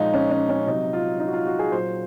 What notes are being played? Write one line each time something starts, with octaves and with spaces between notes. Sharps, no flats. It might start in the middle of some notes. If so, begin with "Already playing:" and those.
Already playing: A#2 F3 G#3 D#4
C#4
C#4
C#4
C3 F#3 D#4
F4
D#4
F#4
F4
F#4
G#4
A#2 F#3 C5